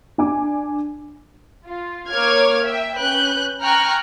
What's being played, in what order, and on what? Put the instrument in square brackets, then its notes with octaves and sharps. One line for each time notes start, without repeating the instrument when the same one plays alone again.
[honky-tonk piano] D4 G#5 D6
[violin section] F4
A#3 C#5 D6 F6 G#6
E5 G5
C#4 B4 F#6 G6
G5 G#5 A#5 C#6 F6 F#6